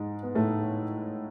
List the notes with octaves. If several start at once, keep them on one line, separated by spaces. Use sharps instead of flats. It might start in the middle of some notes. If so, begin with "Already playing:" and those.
Already playing: G#2 G#3
B3
A2 A3